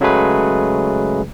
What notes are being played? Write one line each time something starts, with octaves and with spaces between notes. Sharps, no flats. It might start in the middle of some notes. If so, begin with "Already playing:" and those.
C#3 F#3 G#3 A3 G#4 B4